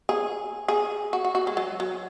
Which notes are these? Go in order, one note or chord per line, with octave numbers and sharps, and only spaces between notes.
G#4
G#4
F#4
F#4
F#4
G#3
F#3
F#3